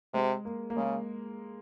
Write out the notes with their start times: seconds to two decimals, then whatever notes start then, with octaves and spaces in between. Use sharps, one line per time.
0.14 C3 G#3
0.45 A#3
0.70 A#3
0.77 C#3 G#3